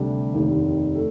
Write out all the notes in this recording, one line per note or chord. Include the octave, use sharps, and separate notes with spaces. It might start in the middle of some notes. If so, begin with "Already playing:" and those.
Already playing: D2 C3 G3 D4 G4
F1 D#2 D#3
A3 G4